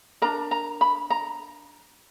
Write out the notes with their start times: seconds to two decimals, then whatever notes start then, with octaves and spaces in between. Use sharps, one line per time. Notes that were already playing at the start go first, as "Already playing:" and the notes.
0.22 D4 A#4 A#5
0.51 A#5
0.81 B5
1.10 A#5